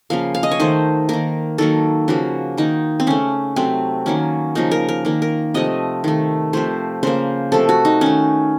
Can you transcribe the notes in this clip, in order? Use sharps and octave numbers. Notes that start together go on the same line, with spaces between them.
C#3 F3 A#3 F5
F5
D#5
C#5
D#3 A3 C5
D#3 A#3 A#4
D#3 F#3 A#3 A4
C#3 F3 A#3 F#4
D#3 A#3 D#4
C4
C#3 A3 C#4
C3 F#3 A3 C4
D#3 F#3 A#3 C#4
C#3 F3 A#3 D#4
A#4
A#4
D#3 A#3
A#4
C3 F3 A3 D#5
D#3 A3
C3 F3 A3 C5
C#3 F3 A#3 C5
C3 F3 A3 A4
F#4
D#4
D#3 A3 C#4